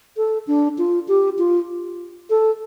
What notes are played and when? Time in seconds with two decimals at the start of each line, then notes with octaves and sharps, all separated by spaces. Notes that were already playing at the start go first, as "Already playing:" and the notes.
0.17 A4
0.47 D4
0.78 F4
1.08 G4
1.38 F4
2.30 A4